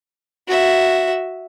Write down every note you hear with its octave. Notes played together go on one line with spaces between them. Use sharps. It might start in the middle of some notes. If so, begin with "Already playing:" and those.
F#4 E5